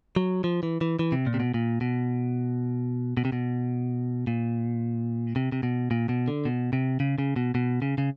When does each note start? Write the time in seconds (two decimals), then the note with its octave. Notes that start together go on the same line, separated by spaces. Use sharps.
0.16 F#3
0.44 F3
0.63 E3
0.81 E3
0.99 E3
1.12 C3
1.26 A#2
1.34 C3
1.40 B2
1.54 A#2
1.81 B2
3.17 B2
3.25 C3
3.32 B2
4.27 A#2
5.36 C3
5.52 C3
5.63 B2
5.91 A#2
6.09 B2
6.28 D3
6.45 B2
6.73 C3
7.00 C#3
7.18 C#3
7.36 B2
7.55 B2
7.82 C#3
7.98 C#3